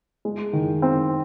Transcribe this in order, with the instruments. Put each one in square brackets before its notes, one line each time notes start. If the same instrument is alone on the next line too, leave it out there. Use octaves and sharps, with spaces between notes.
[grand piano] G#3
D#3
C4